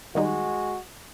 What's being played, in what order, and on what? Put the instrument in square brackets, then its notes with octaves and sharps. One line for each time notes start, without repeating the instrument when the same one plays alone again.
[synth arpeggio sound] D#3 G3 D#4 [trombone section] G#3 F#4